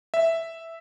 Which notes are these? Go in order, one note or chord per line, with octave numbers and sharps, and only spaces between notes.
E5